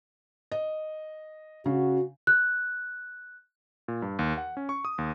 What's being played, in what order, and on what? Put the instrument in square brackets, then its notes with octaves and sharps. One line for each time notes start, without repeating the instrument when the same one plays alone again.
[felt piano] D#5
[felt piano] C#3 [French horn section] F#4
[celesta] F#6
[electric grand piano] A#2
G2
D#2
F#5
C#4
C#6
D#6
D#2